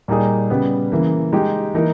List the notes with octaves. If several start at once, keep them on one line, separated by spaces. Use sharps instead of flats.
A#2 G3 A#3 D#4 G#4
C#3 G3 B3
C#3 E3 A#3
G#3 D#4 G4
E3 A#3 D#4 A#4